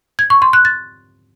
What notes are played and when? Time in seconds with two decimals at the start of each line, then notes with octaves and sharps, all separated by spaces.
0.19 G#6
0.30 C#6
0.42 C6
0.53 F#6
0.65 A6